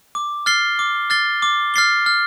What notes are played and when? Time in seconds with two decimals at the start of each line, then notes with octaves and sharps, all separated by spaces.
0.15 D6
0.46 F6 A6 C7 G7
0.79 D6
1.10 F6 A6 C7 G7
1.42 D6
1.74 F6 A6 C7 G7
2.06 F6